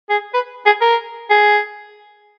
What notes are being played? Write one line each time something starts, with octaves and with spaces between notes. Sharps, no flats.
G#4
B4
G#4
A#4
G#4